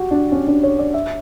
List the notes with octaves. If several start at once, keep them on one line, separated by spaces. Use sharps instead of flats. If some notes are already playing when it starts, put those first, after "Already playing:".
Already playing: F#4 G4
D4
C#4
D4
C#5
D5
E5